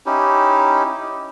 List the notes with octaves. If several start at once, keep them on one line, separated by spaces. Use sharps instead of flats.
C#4 D#4 E4 G4